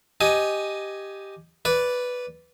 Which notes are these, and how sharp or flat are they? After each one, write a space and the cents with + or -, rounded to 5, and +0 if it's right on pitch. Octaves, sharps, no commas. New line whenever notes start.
G4 +0 D#5 +0 G#5 +10
B4 +0 D5 -10